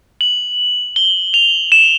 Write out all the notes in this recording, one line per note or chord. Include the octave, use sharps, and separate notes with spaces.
F#7
G7
F7
E7